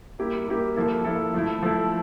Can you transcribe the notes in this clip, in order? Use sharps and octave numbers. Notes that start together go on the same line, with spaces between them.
G3 A#3 E4 G4 A#4
G3 A#3 E4 G4 A#4
F3 A#3 E4 A4
F3 A#3 E4 A4
F3 A3 E4
F3 A3 E4